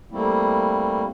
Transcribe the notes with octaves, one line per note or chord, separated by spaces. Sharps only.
G3 A3 A#3 C4 E4